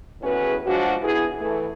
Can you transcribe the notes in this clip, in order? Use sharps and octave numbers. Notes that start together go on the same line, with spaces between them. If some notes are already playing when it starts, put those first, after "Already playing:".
E2 A2 C#4 F#4 G#4 B4
F3 F#3 G#3 D4 F#4
B3 E4 G#4
E3 A3